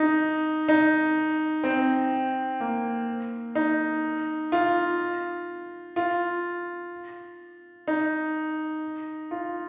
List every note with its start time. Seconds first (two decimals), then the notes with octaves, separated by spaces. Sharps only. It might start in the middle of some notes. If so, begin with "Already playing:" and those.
Already playing: D#4
0.68 D#4
1.64 C4
2.60 A#3
3.55 D#4
4.52 F4
5.96 F4
7.88 D#4
9.31 F4